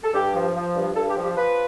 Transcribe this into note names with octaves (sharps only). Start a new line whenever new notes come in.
A4
G2 G4
F3
F3
G2
G2 A4
G4
F3
G4
F3 B4